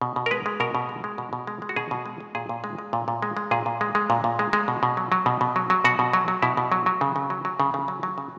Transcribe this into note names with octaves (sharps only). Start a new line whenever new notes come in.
B2
B2
A#4
G#3 B4
G#3
B2 A#4
B2
G#3
G#3
B2
B2
G#3
G#3
F#4
B2 G#4
B2
G#3
G#3
A#2 G#4
A#2
G#3
G#3
A#2
A#2
G#3
G#3
A#2 G#4
A#2
G#3
G#3
A#2
A#2
G#3
G#3
B2
B2
F#3
F#3
B2
B2
F#3
F#3
B2 F#4
B2
F#3
F#3
B2 E4
B2
F#3
F#3
C#3
C#3
F#3
F#3
C#3
C#3
F#3
F#3
C#3